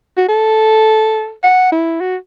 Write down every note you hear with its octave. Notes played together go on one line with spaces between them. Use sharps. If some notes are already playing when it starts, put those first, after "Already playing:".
F#4
A4
F#5
E4
F#4